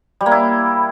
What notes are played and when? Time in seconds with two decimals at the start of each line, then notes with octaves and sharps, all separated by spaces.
0.21 G3
0.26 A#3
0.32 E4